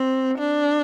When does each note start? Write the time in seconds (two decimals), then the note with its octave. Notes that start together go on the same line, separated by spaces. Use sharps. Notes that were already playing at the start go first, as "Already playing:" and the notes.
Already playing: C4
0.38 D4